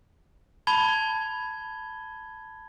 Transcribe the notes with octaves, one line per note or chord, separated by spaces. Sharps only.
A5 B5 G#6 G7